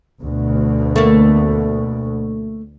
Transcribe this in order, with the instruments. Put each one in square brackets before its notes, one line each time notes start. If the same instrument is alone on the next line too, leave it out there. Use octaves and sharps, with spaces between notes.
[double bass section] D2 B2
[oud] A3 A#3